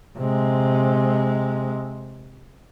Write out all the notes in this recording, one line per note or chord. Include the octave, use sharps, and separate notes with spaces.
C3 G#3